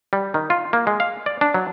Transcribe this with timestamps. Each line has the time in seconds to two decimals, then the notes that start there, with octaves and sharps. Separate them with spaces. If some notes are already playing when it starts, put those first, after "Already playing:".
0.13 G3
0.34 D#3
0.50 F4
0.73 A#3
0.87 G#3
1.00 F5
1.26 D5
1.41 D4
1.54 F#3